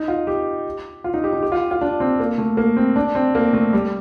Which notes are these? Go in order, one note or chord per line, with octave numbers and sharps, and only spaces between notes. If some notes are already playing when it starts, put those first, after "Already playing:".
Already playing: D#4
F4
G4
F4
D#4
G4
D#4
G4
F4
F4
D4
C4
A#3
A3
A#3
C4
D4
C4
A#3
A3
G3